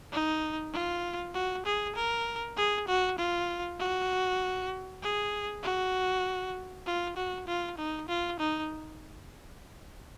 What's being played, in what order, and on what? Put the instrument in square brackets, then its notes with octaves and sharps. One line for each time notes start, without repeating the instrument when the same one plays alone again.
[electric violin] D#4
F4
F#4
G#4
A#4
G#4
F#4
F4
F#4
G#4
F#4
F4
F#4
F4
D#4
F4
D#4